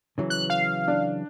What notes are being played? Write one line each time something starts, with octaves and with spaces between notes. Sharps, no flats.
C#3 E3 F#3
F#6
F5
D4